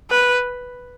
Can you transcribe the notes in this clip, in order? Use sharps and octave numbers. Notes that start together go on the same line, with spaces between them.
B4